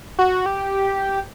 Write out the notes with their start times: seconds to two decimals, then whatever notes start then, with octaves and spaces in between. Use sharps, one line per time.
0.19 F#4
0.46 G4